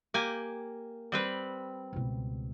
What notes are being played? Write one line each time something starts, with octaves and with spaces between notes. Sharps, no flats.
A#3 G4 G#5
G3 C4 B4
C#2 B2